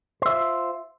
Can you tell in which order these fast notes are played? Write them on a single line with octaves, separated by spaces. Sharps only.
C5 E5 F4